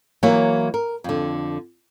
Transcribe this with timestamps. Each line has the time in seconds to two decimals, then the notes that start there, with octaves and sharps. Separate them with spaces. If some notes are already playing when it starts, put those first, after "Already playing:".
0.23 E3 F#3 A#3 C#5
0.74 A#4
1.04 F2 D3